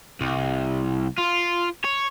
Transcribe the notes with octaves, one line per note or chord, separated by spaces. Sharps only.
C2
F4
C#5